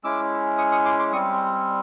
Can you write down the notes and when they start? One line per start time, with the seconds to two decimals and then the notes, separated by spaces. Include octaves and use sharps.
0.04 G#3 C#4 E4 D6 E6
0.58 C#6 D#6
0.72 C#6 D#6
0.85 C6 D6
0.99 C6 D6
1.12 G3 C4 C#6 D#6